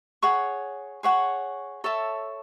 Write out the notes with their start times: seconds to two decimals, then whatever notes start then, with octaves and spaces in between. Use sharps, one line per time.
0.22 G#4 C#5 F#5 C#6
1.03 G#4 C#5 F#5 C#6
1.84 A4 C#5 E5 A5